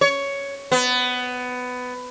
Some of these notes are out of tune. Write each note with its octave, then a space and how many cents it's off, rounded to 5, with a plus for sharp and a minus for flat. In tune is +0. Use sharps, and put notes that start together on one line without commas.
C#5 +10
B3 +15